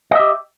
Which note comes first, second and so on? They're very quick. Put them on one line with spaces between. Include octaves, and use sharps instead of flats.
D#5 E5 G4